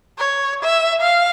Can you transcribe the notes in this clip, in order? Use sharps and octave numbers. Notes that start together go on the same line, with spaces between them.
C#5
E5
F5